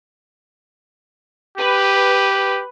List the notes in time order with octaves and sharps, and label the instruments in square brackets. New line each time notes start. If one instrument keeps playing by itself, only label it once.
[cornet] G4 [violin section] B4